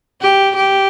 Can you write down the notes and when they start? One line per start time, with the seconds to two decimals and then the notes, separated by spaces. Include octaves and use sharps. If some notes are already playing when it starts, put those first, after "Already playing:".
0.21 G4
0.57 G4